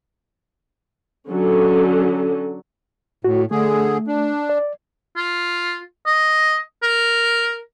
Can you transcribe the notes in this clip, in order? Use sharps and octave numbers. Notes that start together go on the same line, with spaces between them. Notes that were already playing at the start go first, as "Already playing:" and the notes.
D3 F#3 C#4 A4
A2 F#4
D3 A3 G#4
D4
D5
F4
D#5
A#4